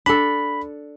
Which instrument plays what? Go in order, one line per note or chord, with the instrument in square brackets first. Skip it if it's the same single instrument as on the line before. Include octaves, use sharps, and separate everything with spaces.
[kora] D4 A4 [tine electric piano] B5